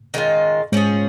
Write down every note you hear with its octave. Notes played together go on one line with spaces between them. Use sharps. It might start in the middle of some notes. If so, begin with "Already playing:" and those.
D#3 G#3 C#4 F4
G#2 F3 G#3 C#4 G#4